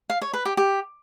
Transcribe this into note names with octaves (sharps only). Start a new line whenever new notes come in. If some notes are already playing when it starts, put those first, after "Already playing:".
F5
C#5
B4
G4
G4